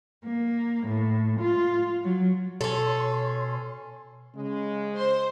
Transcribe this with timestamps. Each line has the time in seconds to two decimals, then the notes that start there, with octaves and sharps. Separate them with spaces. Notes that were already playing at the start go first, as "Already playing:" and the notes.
0.25 A#3
0.87 A2
1.41 F4
2.03 F#3
2.61 B2 C#4 A4 C#5 C6
4.35 C#3 G#3
4.94 C5 C6